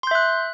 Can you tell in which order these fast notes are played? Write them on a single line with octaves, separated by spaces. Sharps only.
C6 G6 E5 F#6